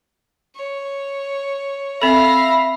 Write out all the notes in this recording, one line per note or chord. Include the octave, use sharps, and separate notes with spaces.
C#5
C4 A4 E5 F5 B5 A#6